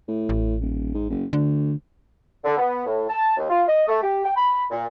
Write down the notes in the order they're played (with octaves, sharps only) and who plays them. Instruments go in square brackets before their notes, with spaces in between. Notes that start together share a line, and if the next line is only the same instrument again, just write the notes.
[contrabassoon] A2
[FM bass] A1
[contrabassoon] D#1
G#2
F#1
[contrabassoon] D2 [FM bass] D3
[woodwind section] D3
B3
A2
A5
D#2
F4
D#5
A3
G4
G5
B5
A#2